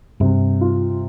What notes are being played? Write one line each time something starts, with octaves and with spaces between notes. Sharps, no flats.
G2 C3
F4